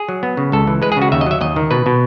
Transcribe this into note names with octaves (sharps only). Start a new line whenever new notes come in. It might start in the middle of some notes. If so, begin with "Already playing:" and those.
Already playing: G#4
F#3
B3
C#3
C#2 A4
E3
G#3 B4
G#4
C#3
F#4
D#2 E5
D#5
F#3 E5
D#2 D#5
D#3
B2 B4
B2